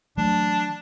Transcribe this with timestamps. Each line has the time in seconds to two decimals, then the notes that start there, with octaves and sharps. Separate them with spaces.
0.17 E3 F#3 A3 D4